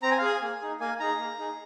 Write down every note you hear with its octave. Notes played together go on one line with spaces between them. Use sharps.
C4 A#5
G#5
F5
G#4 G#5
A#3
D#4 G#4
A#3 G#5
D#4 G#4 A#5
A#3
D#4 G#4